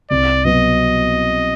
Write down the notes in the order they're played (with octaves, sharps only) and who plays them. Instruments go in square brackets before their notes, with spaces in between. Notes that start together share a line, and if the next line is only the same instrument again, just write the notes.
[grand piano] C2 [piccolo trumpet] D5
[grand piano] B2 F#3 B3 [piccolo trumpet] D#5